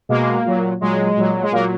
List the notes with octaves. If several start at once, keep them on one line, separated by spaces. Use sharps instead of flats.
B2 G#3 A#3
A#2 F#3
A#2 F#3 G#3
A#2 F#3
G#3
A#2 F#3 A#3